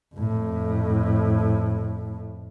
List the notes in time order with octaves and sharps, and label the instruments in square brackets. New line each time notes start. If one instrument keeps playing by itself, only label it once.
[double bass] F2 A2